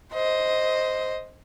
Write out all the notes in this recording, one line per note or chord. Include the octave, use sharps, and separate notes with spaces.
C5 D#5